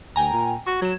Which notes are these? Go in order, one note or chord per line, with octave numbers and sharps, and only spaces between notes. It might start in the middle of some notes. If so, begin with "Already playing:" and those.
D2 G5 G#5 A#5
A#2
F#4 C#6
F#3 G#6 E7